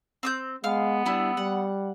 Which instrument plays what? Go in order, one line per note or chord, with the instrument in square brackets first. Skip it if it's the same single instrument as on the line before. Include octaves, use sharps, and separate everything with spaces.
[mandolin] C4 D#6 G6
[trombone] G#3 [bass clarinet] B3 [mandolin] F5 F6
[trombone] G3 [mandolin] D4 E4
[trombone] G3 [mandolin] F#5